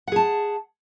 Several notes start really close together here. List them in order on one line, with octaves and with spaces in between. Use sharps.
F#5 G#4 A5